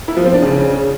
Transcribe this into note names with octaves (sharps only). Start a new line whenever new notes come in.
E4
F3
C4
D4
C#3